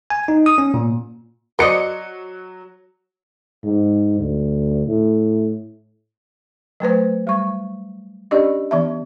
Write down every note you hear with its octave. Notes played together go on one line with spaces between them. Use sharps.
G#5
D#4
D#6
C#4
A#2
F#3 C5 D5 D#5 C#7
G#2
D2
A2
F#3 A3 B4 C5
G3 C#6
C#4 D4 G4 D5 D#5
E3 B3 E5